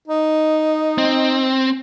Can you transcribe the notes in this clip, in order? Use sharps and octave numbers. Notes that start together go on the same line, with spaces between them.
D#4
C4